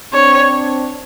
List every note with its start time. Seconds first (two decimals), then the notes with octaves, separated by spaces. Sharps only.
0.13 C4 D4 C#5